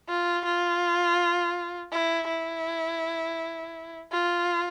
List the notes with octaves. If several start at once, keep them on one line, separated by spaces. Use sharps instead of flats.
F4
F4
E4
E4
F4